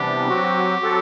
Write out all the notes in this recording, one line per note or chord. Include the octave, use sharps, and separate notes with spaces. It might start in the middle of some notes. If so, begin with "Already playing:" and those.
Already playing: C3 E3 G3 B3 D4 G4
F#3 C4 F#4
F#3 C4 F#4 A4